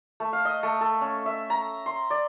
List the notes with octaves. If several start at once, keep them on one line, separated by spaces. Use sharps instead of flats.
A3
F5
D#5
A3
A4
C#4
E5
A#5
C6
D5